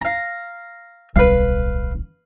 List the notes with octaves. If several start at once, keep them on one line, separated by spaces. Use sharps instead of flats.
F5 A#5
D1 B1 G3 B4 F5